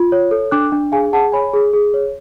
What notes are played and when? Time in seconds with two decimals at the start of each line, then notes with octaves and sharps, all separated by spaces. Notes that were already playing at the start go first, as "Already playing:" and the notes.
Already playing: F4
0.12 C#5
0.31 A4
0.51 D4 D6 F#6
0.72 D4
0.92 G#4 F5 G#5
1.13 G#4 F#5 A5
1.32 C#5 G#5 B5
1.53 G#4
1.73 G#4
1.94 C#5